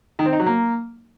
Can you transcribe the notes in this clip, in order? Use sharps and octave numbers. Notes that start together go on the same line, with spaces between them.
D#3
C4
D#4
F#3
A#3